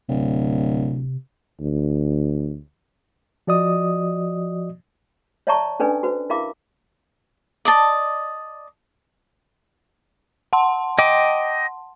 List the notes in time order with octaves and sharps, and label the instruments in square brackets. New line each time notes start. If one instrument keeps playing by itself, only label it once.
[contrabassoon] D1 [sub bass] C3
[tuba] D2
[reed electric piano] F3 F#4 D5 D#5 D#6
[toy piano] C#5 D5 E5 A5 A#5 C#6
C#4 D4 A4 B4 D5 G#5
F#4 B4 C5
E4 A#4 E5 F5 B5 D6
[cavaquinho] D5 D#5 A5
[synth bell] F#5 A5 C6
[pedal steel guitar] D#5 G5 D6